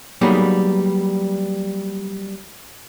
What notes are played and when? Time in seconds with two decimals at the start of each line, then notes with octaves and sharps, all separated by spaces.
0.21 F#3 G3 A#3 B3 D#4 G#4